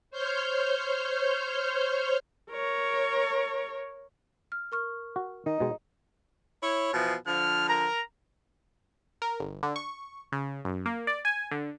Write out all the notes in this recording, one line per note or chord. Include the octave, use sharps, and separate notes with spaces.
C5 C#5 F6 G6
A#4 C#5
F6
A#4 C#6 F6
F#4
D#3 D#4
B2 G#3
E4 C#5
B2 E3 F3
D3 F3 F6
A#4 A#5
A#4
G1
D3
C#6
C#3
F#2
A#3
D5
G#5
D3